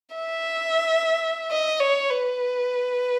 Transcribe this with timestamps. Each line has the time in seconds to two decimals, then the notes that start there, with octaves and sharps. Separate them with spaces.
0.16 E5
1.51 D#5
1.80 C#5
2.10 B4